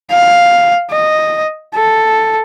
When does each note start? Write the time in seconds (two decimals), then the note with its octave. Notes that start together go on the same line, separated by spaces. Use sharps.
0.11 F5
0.90 D#5
1.75 A4